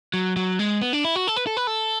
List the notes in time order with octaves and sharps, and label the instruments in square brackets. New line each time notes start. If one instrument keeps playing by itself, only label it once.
[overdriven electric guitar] F#3
F#3
G#3
B3
D4
E4
F#4
A4
B4
A4
B4
A4